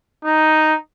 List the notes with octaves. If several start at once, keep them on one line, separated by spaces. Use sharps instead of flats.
D#4